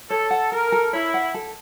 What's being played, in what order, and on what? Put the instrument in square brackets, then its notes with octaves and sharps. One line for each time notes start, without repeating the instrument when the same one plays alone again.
[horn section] A4 [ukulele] C#5
[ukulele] F#5
[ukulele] A4 [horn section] A#4
[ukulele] A4
[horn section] E4 [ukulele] C#5
[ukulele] F#5
A4